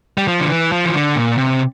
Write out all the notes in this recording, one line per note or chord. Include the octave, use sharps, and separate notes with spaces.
G3
F3
D3
E3
F3
E3
D3
A#2
C3